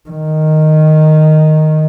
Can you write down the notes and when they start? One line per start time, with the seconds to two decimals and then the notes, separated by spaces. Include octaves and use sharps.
0.09 D#3